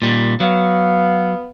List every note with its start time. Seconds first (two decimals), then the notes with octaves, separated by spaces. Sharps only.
0.02 A#2 G3
0.40 F#3 B3 F5